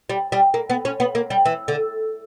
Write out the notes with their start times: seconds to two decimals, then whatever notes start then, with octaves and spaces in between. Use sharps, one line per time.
0.10 G3
0.32 G3
0.54 A#3
0.70 B3
0.85 C#4
1.00 B3
1.15 A#3
1.30 G3
1.45 E3
1.68 D3